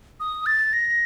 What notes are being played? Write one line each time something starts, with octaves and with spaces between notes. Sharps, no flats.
D#6
A6
A#6